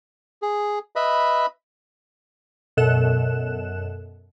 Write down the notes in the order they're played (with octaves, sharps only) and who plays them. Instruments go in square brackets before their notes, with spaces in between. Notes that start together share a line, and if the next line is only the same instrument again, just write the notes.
[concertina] G#4
B4 D#5 E5 B5
[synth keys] F#2 B2 A4 F#6 E7